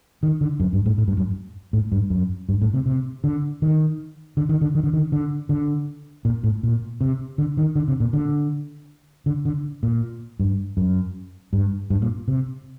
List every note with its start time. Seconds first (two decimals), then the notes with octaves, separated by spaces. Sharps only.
0.23 D#3
0.41 D3
0.60 F#2
0.73 G2
0.86 A2
0.98 A2
1.08 G2
1.17 F#2
1.73 A2
1.92 G2
2.10 F#2
2.49 G2
2.62 A2
2.74 C3
2.86 C3
3.24 D3
3.62 D#3
4.37 D3
4.49 D#3
4.61 D3
4.75 D#3
4.84 D3
4.93 D#3
5.12 D3
5.49 D3
6.25 A#2
6.44 A2
6.63 A#2
7.01 C3
7.38 D3
7.57 D#3
7.76 D3
7.88 C3
8.00 A#2
8.13 D3
9.26 D3
9.45 D3
9.83 A#2
10.40 G2
10.77 F#2
11.53 G2
11.90 G2
12.02 A#2
12.28 C3